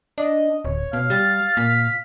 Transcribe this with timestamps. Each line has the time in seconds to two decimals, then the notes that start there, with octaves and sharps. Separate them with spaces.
0.18 D4 D#5
0.65 D1 C#5
0.93 B2 F5
1.10 G3 A6
1.57 A#2 B6